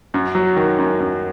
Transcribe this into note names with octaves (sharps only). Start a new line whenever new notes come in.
F#2
F#3
D#3
F#2
F#2